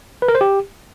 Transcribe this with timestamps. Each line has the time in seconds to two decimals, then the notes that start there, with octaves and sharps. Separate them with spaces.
0.22 B4
0.28 A#4
0.35 C5
0.41 G4